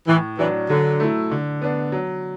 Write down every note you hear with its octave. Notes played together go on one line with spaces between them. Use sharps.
A2 E3
E3 F#3 D4
D3 F#3
A3 E4
D3
B3 D4
F#3